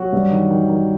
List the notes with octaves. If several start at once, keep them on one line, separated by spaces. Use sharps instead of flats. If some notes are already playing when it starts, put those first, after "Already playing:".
Already playing: F#3 F#4
G2
D#3
D#3
D#3